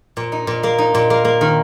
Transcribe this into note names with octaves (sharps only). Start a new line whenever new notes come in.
A#2
D#4
A#2
A#3
D#4
A#2
A#3
A#3
D#3